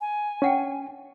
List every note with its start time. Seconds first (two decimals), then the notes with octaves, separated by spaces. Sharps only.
0.01 G#5
0.42 C#4 D4 F#5 G5